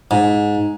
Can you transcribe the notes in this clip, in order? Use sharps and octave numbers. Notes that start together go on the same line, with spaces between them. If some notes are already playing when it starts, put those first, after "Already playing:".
G#2